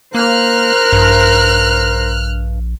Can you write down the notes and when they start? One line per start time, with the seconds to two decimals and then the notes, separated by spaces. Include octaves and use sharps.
0.15 A#3 A#4 C5 F6 F#6
0.92 A#1 G2